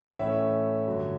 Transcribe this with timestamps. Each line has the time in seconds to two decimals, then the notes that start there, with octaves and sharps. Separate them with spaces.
0.19 A2 E3 A3 C#4 E4 C#5 E5
0.87 G2 D3 F#3